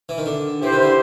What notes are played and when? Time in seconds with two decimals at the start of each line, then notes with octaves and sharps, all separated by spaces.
0.09 E3
0.18 D#3
0.26 D3
0.62 E3 E4 G4 C5
0.73 D#3
0.83 D3